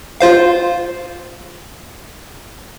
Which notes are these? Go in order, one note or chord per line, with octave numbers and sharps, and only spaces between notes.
F4 C5 F5